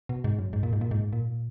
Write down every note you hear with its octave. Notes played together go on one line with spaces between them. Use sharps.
B2
G#2
F#2
G#2
A#2
G#2
A#2
G#2
A#2